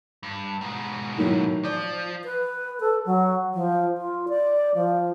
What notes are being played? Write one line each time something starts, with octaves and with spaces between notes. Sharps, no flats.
G2
G#2 B2
A2 D#3 F#3
F3 D5
B4
A4
F#3
F3
F4
D5
F3